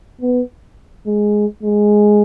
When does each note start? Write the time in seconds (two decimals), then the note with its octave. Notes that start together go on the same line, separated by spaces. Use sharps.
0.21 B3
1.07 G#3
1.63 G#3